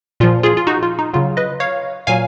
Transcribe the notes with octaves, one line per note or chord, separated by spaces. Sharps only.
A#2 F3 F4
F4 G#4
F4
D#4 F#4
F4
D#4
C#3 F#3 F4
B4 D#5
C#5 F5
A#2 F#3 F5 G#5